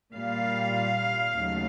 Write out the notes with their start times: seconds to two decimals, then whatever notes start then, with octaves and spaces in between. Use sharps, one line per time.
0.14 A#2 G3 F5
1.37 D#2 C#3 F#3 A3